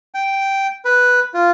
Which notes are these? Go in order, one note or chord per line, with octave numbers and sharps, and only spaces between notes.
G5
B4
F4